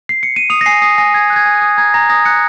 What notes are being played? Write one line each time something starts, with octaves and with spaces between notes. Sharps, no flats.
C7
C#7
D#7
D#6 F7
A#6
G#5 C7
D#6 C7
G#5 A#6
G#5 G#6
F#6
G#6
G#5
D#6
A#5 G#6
A#5 A#6
D#6 A#6
F#6 C#7